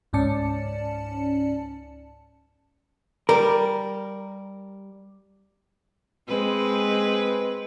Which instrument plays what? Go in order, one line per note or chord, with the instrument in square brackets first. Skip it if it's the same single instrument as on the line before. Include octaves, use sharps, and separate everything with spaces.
[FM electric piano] C#2 G#2 C#4 D5 A5 C#7
[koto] G3 [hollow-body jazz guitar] A#4
[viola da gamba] G#3 C4 B4